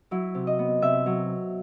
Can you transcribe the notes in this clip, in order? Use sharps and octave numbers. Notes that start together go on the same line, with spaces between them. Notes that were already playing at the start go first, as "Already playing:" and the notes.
F#3 E4
C3
D#5
B3
C3 E5
F#3